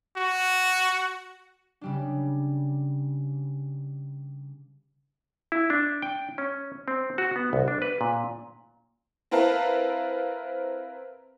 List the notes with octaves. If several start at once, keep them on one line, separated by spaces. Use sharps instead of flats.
F#4
C#3 G3 D4
E4
D4
G5
C#4
C4
F#4
B3
C2
D4
B4
A#2
C4 E4 A#4 B4 F5 A5